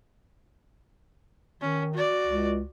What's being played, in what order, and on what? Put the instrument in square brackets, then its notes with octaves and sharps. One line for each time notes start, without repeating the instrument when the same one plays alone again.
[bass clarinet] D#3 [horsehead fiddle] C#4
[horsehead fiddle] F#4 D5
[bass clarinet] C#2